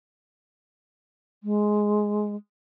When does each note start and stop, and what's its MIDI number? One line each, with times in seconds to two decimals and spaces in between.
1.44 2.35 56